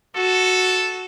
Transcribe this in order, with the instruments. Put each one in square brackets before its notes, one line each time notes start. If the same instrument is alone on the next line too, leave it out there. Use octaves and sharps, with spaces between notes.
[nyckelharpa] F#4 [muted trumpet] A4